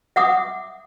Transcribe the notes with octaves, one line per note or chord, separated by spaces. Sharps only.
E5 F#5 D6 D#6